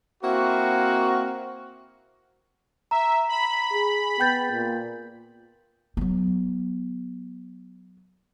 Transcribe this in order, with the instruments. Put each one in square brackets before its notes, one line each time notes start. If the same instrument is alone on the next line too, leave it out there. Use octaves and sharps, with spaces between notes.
[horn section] A#3 C4 E4 F#4
[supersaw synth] E5 [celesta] A#5
[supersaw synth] B5
[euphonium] G#4
[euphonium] B3 [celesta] G5 G6 A6
[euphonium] A#2
[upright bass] F#3 B3